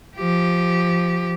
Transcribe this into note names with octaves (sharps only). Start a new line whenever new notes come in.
F3 G4